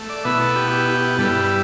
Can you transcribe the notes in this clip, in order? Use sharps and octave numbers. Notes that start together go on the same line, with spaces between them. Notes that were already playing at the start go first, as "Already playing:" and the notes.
Already playing: A3
D5
B2 B3 E4 E5
A4
G4
G4
E4
G4
G2 G3 E4 A4
B4